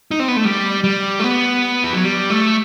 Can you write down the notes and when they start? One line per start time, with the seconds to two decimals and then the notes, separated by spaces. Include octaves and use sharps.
0.11 D#4
0.20 C4
0.28 B3
0.36 A3
0.45 G3
0.84 G3
1.19 A3
1.24 B3
1.84 E3
1.93 F#3
2.04 G3
2.30 A3